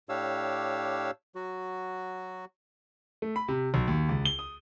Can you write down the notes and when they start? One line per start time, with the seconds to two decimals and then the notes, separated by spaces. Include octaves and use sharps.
0.09 A2 D4 G4 C#5 F5 E6
1.35 F#3 F#4
3.22 A3
3.36 B5
3.48 C3
3.74 B1
3.88 D#2
4.09 C#2
4.25 G7
4.39 D#6